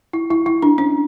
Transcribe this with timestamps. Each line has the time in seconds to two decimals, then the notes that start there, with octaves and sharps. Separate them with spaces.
0.13 E4
0.30 E4
0.46 E4
0.62 D4
0.78 C#4